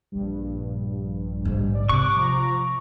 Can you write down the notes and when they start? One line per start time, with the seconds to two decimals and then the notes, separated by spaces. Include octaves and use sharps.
0.12 A#1 G2
1.45 G#2 D3
1.74 D5
1.89 C3 C#6 D6 F#6
2.16 F3 A#5